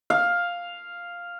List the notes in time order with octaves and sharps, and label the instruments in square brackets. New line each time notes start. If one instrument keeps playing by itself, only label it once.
[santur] F5